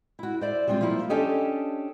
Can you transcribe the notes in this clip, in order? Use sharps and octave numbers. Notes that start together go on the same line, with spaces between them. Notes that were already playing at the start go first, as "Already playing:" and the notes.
E4 F#4
C5 D5 E5
G3 G#3 C4 D4 F4
F3 G3 A#3 E4 G4
C#4 D4 G4 A4 C#5 D#5